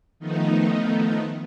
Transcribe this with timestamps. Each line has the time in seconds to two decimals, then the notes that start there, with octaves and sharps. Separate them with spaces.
0.19 D#3 F3 A3 B3 D#4